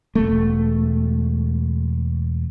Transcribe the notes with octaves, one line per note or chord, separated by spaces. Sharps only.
E1 A3